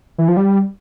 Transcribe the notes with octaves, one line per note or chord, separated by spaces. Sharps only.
E3
F3
G3